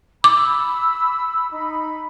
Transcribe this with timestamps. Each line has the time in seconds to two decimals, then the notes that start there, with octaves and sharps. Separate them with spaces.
0.24 B5 D6 E6
1.53 D#4 B5